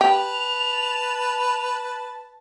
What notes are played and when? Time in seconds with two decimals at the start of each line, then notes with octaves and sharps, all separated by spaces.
0.01 G4 B4 A5 F7